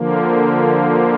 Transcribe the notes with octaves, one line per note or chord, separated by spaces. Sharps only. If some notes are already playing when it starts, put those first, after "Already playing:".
Already playing: D3 F3 A#3